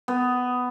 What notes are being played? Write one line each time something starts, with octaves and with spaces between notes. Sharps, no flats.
B3